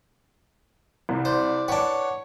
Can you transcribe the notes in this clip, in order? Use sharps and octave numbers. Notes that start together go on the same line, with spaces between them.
C2
C5 D5
D4 B4 C#5 F#5